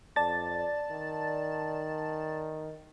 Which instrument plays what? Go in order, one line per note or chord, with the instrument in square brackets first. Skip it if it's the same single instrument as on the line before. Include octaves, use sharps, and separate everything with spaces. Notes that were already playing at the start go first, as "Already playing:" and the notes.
[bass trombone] F2 [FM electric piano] D5 A5 A6
[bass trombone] D#3